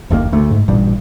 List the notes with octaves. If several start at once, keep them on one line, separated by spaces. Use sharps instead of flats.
F#1 D#2 A#2 A#3
D2 A3
G#2
A1 G2 A#2 G3